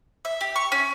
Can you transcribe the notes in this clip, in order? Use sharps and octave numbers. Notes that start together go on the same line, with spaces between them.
E5
G4
C#6
C#4